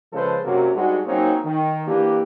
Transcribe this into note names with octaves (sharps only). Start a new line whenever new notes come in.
C#3 F3 G#3 A4 B4 C5
F#2 C3 F#3 A#3 C#4 F#4
G#2 G3 G#3 D4 F#4
F#3 A#3 C4 C#4 D#4
D#3
E3 A#3 D4 G4